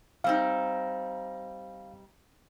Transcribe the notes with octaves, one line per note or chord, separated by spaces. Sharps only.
G3 C4 D#4 F5